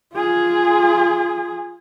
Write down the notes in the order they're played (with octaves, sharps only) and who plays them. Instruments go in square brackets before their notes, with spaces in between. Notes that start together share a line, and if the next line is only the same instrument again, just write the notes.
[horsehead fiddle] F4 G#4